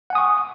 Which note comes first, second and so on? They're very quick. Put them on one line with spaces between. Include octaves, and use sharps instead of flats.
F#5 G#5 D#6 C#6